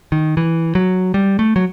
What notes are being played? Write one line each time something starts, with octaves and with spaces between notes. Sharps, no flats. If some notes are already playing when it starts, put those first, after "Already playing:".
D#3
E3
F#3
G3
A3
F#3